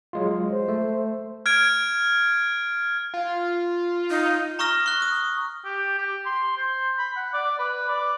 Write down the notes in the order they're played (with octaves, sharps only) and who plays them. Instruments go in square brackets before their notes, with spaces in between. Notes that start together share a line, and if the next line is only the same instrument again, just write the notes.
[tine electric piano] F#3 G#3 F4
[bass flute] C5
[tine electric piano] A3
[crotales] F6 G#6 D7
[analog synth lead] F4
[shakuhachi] D#4
[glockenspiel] A#5 C#6 D#6 F6 A#6
C#6 F#6
D#6
[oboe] G4
G4
C6
C5
B5
F#5
D5
B4
D5